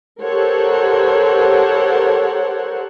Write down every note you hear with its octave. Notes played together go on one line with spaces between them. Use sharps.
G4 A4 A#4 C5 C#5 F#5